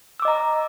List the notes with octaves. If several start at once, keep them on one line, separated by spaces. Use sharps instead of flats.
D#5 A#5 D6 E6